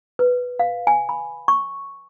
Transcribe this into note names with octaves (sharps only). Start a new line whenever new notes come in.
B4
F5
G#5
B5
C#6